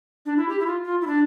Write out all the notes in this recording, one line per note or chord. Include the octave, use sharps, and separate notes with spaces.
D4
E4
G4
E4
F4
F4
E4
D4